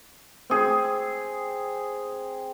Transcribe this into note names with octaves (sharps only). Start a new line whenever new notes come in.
C4 G#4